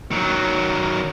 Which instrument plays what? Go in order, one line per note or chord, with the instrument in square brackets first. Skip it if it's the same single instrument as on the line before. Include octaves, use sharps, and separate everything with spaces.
[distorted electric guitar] D#3 F#3